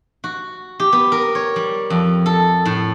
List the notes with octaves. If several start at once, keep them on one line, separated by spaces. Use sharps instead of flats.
F#4
G4
B3
A#4
C#5
G3
F2
A4
A2